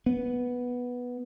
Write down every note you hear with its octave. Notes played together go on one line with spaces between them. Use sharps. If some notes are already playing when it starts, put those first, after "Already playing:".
B3